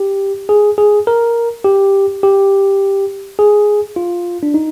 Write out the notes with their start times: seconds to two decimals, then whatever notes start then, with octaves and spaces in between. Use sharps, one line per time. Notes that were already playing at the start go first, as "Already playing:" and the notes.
Already playing: G4
0.49 G#4
0.78 G#4
1.07 A#4
1.65 G4
2.23 G4
3.39 G#4
3.96 F4
4.43 D4
4.54 D#4